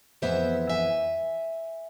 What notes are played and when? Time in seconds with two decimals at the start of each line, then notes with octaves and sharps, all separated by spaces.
0.22 F2 E3 G#3 B3 C5 E5
0.70 E5 G#5